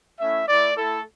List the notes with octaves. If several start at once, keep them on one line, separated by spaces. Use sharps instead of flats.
A3 C#4 E4 E5
A3 E4 D5
A3 E4 A4